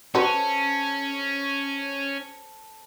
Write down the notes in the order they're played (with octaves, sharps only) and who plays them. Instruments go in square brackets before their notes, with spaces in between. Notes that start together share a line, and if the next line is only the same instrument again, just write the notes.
[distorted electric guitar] C#4 [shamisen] F#4 B4 [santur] A4 C5